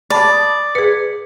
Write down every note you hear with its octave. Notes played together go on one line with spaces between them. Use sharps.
D5 A5 B5 D6
D#6
G#4 B4 C#7